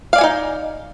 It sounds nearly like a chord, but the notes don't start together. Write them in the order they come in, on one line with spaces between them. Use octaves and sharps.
F5 D5 G#5 F#4 D#4